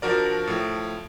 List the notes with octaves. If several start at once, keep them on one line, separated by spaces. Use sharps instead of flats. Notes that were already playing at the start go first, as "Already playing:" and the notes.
F3 D4 F#4 A#4 D5
A2 F3